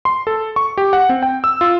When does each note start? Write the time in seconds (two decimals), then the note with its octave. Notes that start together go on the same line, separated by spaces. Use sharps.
0.05 C6
0.27 A4
0.56 C#6
0.78 G4
0.93 F#5
1.09 C4
1.23 G5
1.44 E6
1.61 F4